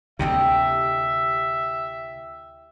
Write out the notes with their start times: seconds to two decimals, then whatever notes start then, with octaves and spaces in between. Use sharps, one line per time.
0.19 D2 C3 E4 G4 D#5 E5